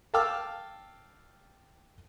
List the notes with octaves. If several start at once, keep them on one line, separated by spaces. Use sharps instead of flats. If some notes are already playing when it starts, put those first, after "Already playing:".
F5 G5 A5 D6 E6 F6